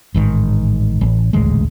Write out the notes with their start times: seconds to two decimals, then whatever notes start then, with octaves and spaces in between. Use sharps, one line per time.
0.14 A1 G#2 D#3
1.01 A1
1.33 D#1 A1 D2 G#3